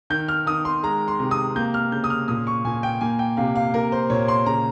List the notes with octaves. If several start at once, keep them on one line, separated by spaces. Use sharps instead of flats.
D#3 G6
F6
D#3 D#6
C6
G#3 A#5
C6
C3
D#6
A#3 G6
F6
C#3 G6
D#6
F6
A#2 D#6
C#6
A#2 G#5
G5
A#3 G#5
G5
C3 F5
F5
A#3 A#4
C5
A#2 C#5
C6
C#3 A#5